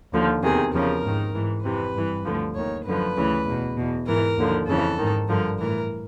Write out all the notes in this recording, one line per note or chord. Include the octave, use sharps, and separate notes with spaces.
D#2 D3 F3
E2 C3 D#3 G#4
E2 C#3 F3 A#4
G#2 D#3
G#2 E3
F2 C3 E3 B4
G2 E3
D2 D3 F3
D#2 D#3 C#5
F#2 D3 F3 B4
D2 C#3 E3
E2 B2
E2 B2
G#2 E3 A#4
D#2 D3 F3
F2 C#3 E3 A4
G#2 D#3
G2 D3 F3 A#4
A2 E3 A#4